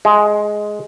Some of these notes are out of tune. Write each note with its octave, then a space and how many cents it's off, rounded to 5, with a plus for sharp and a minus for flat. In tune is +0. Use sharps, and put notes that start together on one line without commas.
G#3 +10